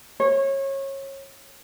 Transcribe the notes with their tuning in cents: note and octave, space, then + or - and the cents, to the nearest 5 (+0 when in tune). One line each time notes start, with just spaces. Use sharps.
C#5 -25